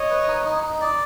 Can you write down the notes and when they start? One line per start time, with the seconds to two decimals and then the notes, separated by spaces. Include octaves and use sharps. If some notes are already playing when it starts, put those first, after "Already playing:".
Already playing: C#5 D#5
0.10 B4
0.28 D#4
0.45 D#4
0.63 D#4
0.81 D5